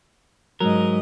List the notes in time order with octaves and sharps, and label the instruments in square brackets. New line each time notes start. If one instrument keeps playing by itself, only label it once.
[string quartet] G#2 D#5 [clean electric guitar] F#3 A#4